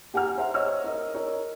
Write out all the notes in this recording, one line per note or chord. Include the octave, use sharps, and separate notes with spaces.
G4 F#5 G#5 A#5 F6
C5 E5 F#5 A#5
C#5 D#5 E6 F6
A#4 D#5
A#4 C#5 D#5